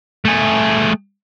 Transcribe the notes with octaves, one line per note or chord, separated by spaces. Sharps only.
A3 G#4